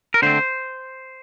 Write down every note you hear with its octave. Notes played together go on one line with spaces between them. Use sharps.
A#4
D3 A3 C4 C5